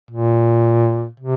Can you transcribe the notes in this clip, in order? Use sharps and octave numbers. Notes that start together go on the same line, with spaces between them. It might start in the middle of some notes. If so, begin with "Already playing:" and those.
A#2
C3